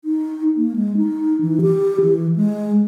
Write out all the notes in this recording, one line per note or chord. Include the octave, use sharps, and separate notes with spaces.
D#4
A#3
G#3
D#4
E3
G4
E3
G#3